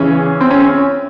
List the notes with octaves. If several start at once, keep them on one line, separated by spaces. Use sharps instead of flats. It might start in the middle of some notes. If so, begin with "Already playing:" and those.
Already playing: E2 C#3 E3 C#4
C4
C#4